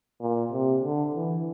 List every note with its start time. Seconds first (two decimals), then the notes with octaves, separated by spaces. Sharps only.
0.21 A#2
0.52 C3
0.83 D3
1.15 E3